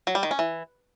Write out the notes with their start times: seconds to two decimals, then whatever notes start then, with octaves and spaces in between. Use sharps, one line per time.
0.07 F#3
0.15 G3
0.23 D#3
0.31 C#4
0.39 E3